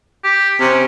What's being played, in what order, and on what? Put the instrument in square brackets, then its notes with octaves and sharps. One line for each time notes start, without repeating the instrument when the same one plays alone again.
[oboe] G4
[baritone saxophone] C3 [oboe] C#4